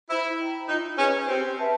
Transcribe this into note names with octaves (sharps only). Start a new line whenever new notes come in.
E4 C5
D#5 G5 A#5
D#4 F4
C#4 G#4 B4 D#5
C4 G4
B4 E5 A5